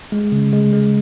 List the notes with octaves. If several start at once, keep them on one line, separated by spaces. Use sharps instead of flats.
G#3
C#3
G#3
G#3